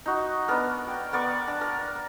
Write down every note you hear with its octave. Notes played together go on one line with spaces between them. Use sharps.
D#4 F#4
B3 D4 A#4
G5
B3 A#4 D5 C#6
D4
A#4